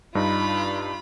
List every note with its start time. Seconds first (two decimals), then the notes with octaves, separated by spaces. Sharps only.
0.15 G2 D4 D#4 F4 B5